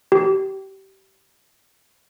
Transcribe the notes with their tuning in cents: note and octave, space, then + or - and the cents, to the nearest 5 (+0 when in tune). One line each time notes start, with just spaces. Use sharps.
G4 -25